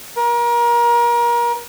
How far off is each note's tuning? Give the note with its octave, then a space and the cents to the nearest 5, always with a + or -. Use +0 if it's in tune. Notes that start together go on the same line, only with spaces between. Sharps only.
A#4 +30